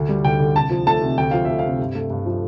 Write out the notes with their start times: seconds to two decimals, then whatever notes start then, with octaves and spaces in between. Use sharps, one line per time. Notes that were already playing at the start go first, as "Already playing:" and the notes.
Already playing: D2
0.09 G3
0.24 D2 G5
0.40 D3
0.55 C2 A5
0.70 F3
0.86 A3 A5
1.02 C3
1.18 D2 G5
1.31 F3 F5
1.45 A3 E5
1.59 F5
1.64 C3
1.80 G2
1.95 A3
2.10 G2
2.26 F3